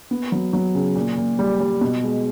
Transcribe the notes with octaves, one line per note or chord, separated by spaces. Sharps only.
B3
F#3
F#3
C#3
A#2
A#2
G3
G3
B2
G#3